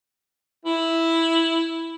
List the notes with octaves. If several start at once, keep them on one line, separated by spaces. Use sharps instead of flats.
E4